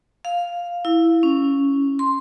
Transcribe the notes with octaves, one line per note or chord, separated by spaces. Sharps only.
F5
E4
C#4
C6